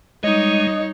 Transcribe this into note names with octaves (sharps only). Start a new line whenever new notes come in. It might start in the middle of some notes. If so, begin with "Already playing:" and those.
G3 G#3 D#4 C#5 D#5